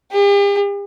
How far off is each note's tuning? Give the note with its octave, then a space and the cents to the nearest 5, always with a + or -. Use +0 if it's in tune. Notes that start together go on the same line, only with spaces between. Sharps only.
G4 +45